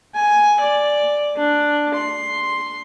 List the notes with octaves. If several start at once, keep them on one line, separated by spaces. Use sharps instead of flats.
G#5
D5
D4
C6